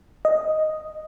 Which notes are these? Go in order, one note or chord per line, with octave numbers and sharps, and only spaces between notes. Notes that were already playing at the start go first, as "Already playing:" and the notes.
D#5